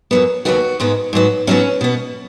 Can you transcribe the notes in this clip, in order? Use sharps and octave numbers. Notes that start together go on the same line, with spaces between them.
F#2 F#3 B3
D#2 C#3 F#3 B3 F#4
G#2 G#3 B3
G#2 F#3 B3
G#2 F#3 B3 C#4
B2 B3